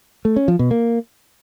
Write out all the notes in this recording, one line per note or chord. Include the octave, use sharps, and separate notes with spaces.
A3
C#4
F3
B2
A#3